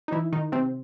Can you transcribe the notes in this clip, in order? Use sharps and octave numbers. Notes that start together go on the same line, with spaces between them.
D#4
E3 E4
D#3 D#4
C3 C4